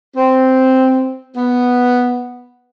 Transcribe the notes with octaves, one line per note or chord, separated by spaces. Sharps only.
C4
B3